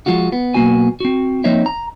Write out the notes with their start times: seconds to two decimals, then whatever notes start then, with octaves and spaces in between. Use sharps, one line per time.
0.06 F3 G#3 F4 F#4
0.32 B3
0.54 B1 A#3 B3 F#4 G#5
1.00 C4 F#4
1.44 F3 A#3 C4 D#4 C#5 E5
1.66 A#5